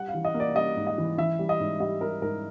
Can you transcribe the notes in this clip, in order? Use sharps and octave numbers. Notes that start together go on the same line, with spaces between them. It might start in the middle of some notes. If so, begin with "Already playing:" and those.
Already playing: G3 F#5
F5
E3
D#5
A#3
D5
G3 D#5
G#2
D#5
E3
E3 E5
G3
D#5
G#2
G3 D#5
G3 A#4
G#2 A#4